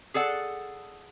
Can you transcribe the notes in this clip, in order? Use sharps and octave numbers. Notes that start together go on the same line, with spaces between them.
G#4 A4 D5 F#5